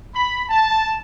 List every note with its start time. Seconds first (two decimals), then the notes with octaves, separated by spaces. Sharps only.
0.15 B5
0.49 A5